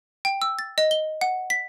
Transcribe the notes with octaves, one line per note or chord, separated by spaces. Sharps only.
G5
E6
A6
D#5
G7
F#5
B6